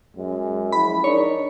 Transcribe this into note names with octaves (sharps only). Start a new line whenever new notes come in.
F#2 G#3
F3 G#3 E4 B5
D4 D#4 A#4 C#5 D5